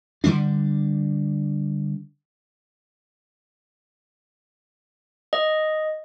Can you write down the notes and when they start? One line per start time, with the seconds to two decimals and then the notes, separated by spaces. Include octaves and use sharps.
0.24 D3 F#3 G3 D4
5.33 D#5